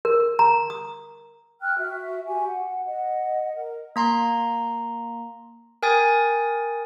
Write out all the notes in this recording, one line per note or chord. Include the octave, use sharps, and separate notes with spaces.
A#4
A#5
D#6
G5 F6 F#6
F#4 E5
F#4 G4 G#5
F#5
D#5 F#5
A#4
A#3 A#5 C6
A#4 G5 G#5 D#6 A6